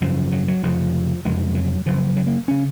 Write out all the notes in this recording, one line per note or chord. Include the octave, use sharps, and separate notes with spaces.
G#1 F#2 C#3 F3
F#3
F#3
F1 F2 C#3 F3
F#1 F2 C3 G#3
F#3
F#1 F#2 C#3 F3
F#3
A#3
C#3 C#4